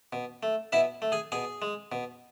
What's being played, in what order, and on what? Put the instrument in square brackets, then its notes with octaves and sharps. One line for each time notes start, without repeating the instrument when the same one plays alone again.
[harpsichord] B2
A3
B2 E4 E5
A3
G#4 G#5
B2 G#4 G#5
G#3
B2